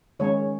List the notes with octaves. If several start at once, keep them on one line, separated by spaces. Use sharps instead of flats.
D#3 G#3 C#4 C#5